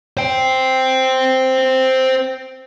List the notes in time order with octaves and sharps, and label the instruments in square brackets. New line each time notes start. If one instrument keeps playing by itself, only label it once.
[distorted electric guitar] C5 G5